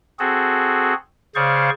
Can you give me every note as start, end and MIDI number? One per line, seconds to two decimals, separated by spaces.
0.19 0.94 60
0.19 0.94 66
0.19 0.94 68
0.19 0.94 69
1.35 1.70 49
1.35 1.70 68
1.35 1.70 72
1.35 1.70 74
1.35 1.70 77
1.35 1.70 85